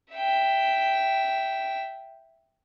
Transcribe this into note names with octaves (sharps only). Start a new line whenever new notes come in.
E5 G5